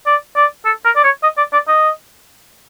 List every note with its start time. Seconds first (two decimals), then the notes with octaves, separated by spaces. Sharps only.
0.06 D5
0.36 D5
0.65 A4
0.85 A#4
0.96 D5
1.04 C#5
1.23 D#5
1.37 D5
1.53 D5
1.68 D#5